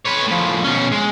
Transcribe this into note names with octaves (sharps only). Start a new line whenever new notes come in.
B4 C#5
A2 F3
B2 C#4
G#3